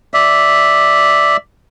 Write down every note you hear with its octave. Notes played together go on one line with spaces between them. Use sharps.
D5 E5